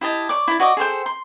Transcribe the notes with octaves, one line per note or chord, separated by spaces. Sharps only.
E4 G4 D#5 A5
C#5 D5 D6
E4 D5
F#4 D5 D#5 D6
G#4 A4 C5 G5
C6